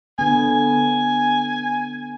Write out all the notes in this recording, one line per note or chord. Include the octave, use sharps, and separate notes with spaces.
D3 B3 G#5